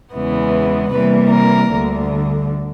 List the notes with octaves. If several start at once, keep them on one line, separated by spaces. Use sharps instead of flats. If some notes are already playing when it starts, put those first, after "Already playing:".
E2 C#3 E3 G#3 B3
C3 E3 G3 A#3 B4
A#4
D2 D3 G3